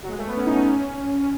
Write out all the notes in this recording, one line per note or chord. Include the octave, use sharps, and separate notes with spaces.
F#3
G#3
A3
B3
C#4
D#4
C#4
C#4